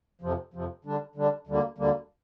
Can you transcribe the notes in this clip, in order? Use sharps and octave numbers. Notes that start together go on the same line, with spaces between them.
F2 C3 F3
F2 C3 F3
D3 G3 D4
D3 G3 D4
D2 D3 G3 A#3
D2 D3 G3 A#3